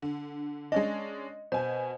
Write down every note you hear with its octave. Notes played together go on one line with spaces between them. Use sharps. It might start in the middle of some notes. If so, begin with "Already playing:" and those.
D3
G#3 C#4 D4 D#5
B2 C5 G#5